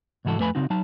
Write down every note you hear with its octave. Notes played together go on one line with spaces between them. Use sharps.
C2 G#2 E3 F#4 A4
F2 A3 B4 G#5 B5
C#3 C4 D#4 F#4
F#3 D#4 A5